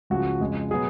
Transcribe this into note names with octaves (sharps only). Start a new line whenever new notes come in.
C#2 C#3 F3 F#4
F2 C#3 G#3
B2 F#3 B3 G#4